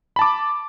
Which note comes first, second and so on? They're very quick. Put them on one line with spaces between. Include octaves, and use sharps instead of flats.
B5 A5 D6